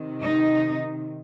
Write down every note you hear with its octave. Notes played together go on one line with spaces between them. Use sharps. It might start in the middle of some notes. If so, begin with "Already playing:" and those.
Already playing: C3 D#3
D#4